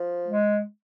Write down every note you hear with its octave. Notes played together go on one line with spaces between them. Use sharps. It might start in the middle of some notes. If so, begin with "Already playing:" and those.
Already playing: F3
G#3